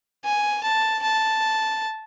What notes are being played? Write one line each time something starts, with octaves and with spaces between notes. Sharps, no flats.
G#5
A5
A5